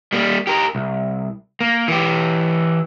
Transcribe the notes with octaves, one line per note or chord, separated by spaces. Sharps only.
G3 A#3
G4 A#4
C2
A#3
E3 G4